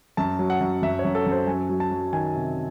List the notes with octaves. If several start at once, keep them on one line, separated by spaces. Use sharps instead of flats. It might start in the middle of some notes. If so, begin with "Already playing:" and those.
F#2 A5
F#3
F#5
F#2
F#2 E5
C#5
F#2
A4
F#2
C5
F#3 G#5
F#3
A5
F#3
D#3 G#5
C3